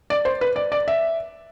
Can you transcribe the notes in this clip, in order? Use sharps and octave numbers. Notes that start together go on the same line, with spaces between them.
D5
C5
B4
D5
D5
E5